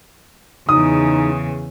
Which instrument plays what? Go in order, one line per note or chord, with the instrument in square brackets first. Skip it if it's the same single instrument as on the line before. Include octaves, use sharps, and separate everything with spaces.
[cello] E2 C#3 [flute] D#4 [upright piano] D#6